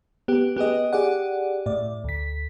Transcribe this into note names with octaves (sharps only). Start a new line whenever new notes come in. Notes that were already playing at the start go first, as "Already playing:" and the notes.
B3 G4
B3 G4 G#4 D#5
G4 G#4 D5 F#5
A2 D5
D2 B6